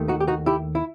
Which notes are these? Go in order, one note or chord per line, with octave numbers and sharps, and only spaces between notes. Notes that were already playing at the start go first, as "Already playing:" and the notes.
Already playing: D#2 D#3 A3
D#4 F#4
G4
D#4 F#4
E4 G4
E4